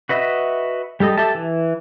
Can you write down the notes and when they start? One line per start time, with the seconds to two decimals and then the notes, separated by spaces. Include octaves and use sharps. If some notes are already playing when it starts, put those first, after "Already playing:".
0.09 F#4 B4 D#5 E5
1.00 G3 G4 A4 D#5
1.18 G4 A4 E5 A5
1.35 E3